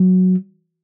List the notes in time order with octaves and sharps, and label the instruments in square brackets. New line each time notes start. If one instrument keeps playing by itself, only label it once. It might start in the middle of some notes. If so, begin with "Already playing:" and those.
Already playing: [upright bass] F#3